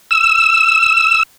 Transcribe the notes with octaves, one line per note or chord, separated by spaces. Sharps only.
E6